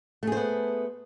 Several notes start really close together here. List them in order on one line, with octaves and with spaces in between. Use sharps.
A3 G#4 C5 B3